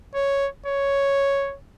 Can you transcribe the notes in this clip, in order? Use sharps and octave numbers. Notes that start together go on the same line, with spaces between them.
C#5
C#5